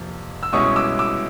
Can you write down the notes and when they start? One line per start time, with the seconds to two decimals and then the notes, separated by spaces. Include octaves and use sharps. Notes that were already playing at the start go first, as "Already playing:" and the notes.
Already playing: F2 C3 F3 A#3
0.43 E6
0.53 C2 B2 G#3 C#4 E4 C#6 D#6
0.76 D6 E6
0.99 D6 E6